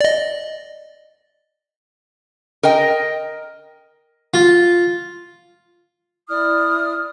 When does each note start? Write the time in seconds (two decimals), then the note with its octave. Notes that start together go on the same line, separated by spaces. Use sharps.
0.01 D5 D#5
2.63 A#4 D#5 G5
4.34 F4
6.29 E4 D5 D#6 F6